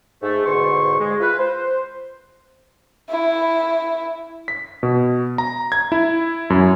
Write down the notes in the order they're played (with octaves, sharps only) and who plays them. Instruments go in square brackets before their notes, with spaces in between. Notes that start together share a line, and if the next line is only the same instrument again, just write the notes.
[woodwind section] G#2 A3
E2 G#2 B2 D3 C5 C#6
G#3
F4 B4
C5
[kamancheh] E4
[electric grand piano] B6
B2
A#5
G#6
E4
F#2